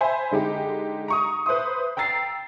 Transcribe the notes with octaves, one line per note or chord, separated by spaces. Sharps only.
C5 E5 G#5 B5
D3 G#3 D#4 G4
A#5 C#6 D#6
B4 C5 E5 C6 D#6
G5 A#5 E6 A6 C7